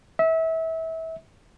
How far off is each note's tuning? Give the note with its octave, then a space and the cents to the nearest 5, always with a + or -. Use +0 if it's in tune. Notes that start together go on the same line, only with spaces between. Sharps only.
E5 -30